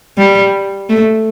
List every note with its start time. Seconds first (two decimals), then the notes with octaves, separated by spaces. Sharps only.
0.18 G3
0.89 A3